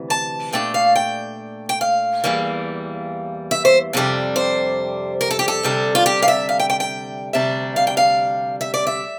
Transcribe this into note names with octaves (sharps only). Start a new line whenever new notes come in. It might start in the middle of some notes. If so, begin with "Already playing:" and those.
Already playing: D2 C3 E3
A5
A#2 A3 D4 G5
F5
G5
G5
F5
E2 E3 G3 A#3
E5
C5
F2 C3 G3 D4
C5
A#4
A4
G4
A4
D2 C3 G3 D4
F4
G4
F5
E5
F5
G5
G5
G5
D2 C3 G3 D4 E5
F5
G5
F5
E5
D5
E5